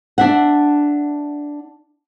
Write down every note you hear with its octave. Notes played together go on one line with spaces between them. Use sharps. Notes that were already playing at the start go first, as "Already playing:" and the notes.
D4 E5 F#5